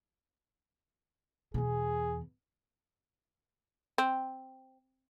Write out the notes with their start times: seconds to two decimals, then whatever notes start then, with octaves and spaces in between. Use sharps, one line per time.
1.54 E2 B2 G#4
3.98 C4